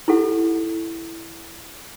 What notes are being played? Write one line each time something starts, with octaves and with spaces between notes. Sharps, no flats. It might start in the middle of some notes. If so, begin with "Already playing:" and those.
E4 G4 A4 F#5